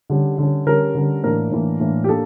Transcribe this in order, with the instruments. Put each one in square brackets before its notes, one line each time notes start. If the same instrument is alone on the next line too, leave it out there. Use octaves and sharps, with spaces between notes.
[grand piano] D3 G3 C#4
D3 G3 C#4
D3 G3 C#4 A#4
D3 G3 C#4
A2 E3 A#3 D4 A#4
A2 E3 A#3 D4
A2 E3 A#3 D4
G4
A#3 D4 A4